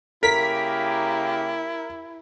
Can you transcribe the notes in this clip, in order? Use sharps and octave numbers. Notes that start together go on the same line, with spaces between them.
C#3 A#3 E4 G4 A#4 B6